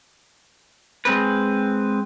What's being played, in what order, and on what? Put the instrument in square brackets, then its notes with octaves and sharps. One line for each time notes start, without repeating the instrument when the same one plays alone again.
[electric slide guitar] G#3 C4 B4